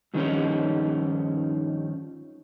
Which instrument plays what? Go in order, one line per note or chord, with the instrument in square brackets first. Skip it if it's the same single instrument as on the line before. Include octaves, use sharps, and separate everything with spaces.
[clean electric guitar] G2 D#3 F3 A3 C#4 D#4